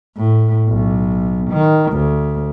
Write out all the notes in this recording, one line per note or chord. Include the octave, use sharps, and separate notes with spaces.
A2
B1
D#3
D2